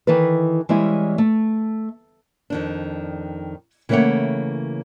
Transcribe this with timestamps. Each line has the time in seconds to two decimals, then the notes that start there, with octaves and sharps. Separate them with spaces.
0.07 D#3 E3 E4 A4 B4
0.69 E3 G3 G#3 C#4 E4
1.18 A3
2.50 F2 D#3 D4
3.89 C#3 E3 A3 A#3 C#5 F#5